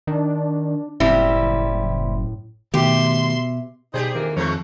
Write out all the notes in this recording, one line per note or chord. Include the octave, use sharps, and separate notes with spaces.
D#3 D4
F#1 A2 G3 C4 E4
B2 D#3 A3 G4 E5 C6
B2 G3 D#4 G4 G#4 C5
F2 D#3 E3 A#3
F2 F3 G#3 A3 C#5